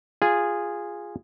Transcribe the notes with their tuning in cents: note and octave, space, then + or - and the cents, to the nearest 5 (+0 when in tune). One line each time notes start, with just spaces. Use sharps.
F4 +0 G#4 -10